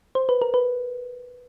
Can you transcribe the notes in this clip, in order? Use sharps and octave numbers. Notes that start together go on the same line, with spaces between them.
C5
B4
A#4
B4